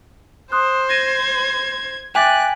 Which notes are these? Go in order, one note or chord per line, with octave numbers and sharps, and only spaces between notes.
C5 C6 D#6 F#6
G#6 A#6 D#7
E5 G5 G#5 D6 F#6 A6 B6